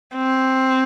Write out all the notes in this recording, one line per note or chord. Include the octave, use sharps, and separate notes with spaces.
C4